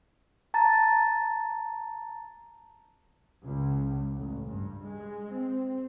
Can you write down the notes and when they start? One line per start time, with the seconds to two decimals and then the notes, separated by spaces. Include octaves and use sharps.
0.54 A5 A#5 A6
3.44 C#2
4.16 A1
4.48 G2
4.84 G#3
5.32 C4